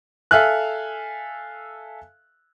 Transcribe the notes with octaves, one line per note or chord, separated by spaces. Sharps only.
A4 E5 F5 G#5 F6 F#6